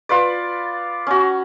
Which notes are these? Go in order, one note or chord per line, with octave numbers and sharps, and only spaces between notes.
F4 B4 D5
C#4 F#4